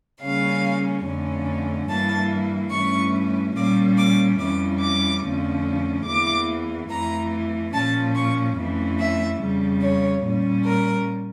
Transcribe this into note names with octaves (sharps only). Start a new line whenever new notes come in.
C#3 G3 A#3 C#4 F5
F2 D3 A3 C#4
G2 E3 A#3 A5
G2 E3 A3 C#4 C#6
A#2 G3 A#3 C#4 D6
D6
F2 E3 G3 C#4 D6
D6
F2 D3 F3 A3 C#4
E2 E3 A#3 D6
F2 E3 A3 A#5
A#2 F3 C#4 A5
C#6
F2 E3 A3 C#4
E5
F2 C#3 G3
C#5
A#2 G3 C#4
A#4